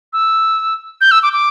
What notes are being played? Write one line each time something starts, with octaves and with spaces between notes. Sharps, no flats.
E6
G6
E6
D6
D6